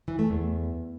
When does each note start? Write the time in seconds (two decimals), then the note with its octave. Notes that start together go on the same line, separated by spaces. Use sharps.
0.08 E3
0.19 A3
0.30 E2